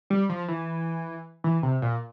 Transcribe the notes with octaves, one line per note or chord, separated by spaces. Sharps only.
G3
F3
E3
E3
C3
A#2